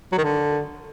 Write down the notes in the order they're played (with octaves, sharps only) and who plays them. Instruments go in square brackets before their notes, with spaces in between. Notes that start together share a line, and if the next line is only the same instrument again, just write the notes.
[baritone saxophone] F#3
D#3
D3